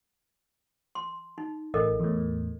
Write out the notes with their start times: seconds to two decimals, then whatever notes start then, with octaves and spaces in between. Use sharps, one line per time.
0.95 C6
1.38 D#4
1.74 A1 A4 A#4 D#5
2.00 E2 A2